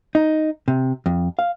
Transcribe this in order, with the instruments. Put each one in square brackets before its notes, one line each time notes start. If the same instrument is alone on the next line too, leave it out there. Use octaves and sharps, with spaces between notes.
[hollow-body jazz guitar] D#4
C3
F2
F5